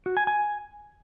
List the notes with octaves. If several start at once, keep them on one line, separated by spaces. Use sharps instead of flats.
F#4
G#5
G#5